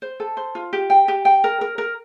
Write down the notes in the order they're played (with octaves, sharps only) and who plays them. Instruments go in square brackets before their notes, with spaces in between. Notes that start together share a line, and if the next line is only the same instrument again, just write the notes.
[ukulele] C5
A4
C5
F4
G4
G5
G4
G5
A#4
A#4
A#4